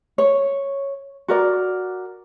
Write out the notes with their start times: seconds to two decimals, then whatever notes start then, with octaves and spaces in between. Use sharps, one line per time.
0.18 C#5
1.28 F#4 A#4 D5